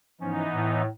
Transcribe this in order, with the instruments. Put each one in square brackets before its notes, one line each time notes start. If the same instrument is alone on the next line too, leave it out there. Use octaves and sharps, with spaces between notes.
[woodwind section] G#2 F3 C#4 [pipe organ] E3 B3 D#4
[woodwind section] A2